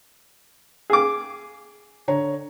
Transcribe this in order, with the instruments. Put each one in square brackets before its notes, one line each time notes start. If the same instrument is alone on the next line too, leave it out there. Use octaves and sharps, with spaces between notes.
[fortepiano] G#4 D6
[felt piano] D3 C#5 A#5